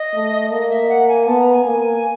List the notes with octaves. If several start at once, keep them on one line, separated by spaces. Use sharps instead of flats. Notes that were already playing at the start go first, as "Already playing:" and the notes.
Already playing: D#5
A3
A#3 D#5
E5
F#5
G#5
B3 A5
A#5
G#5
A#3